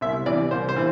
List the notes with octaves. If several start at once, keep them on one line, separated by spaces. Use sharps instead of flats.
C2 E5
C3 E3 D5
C2 C5
C5
E3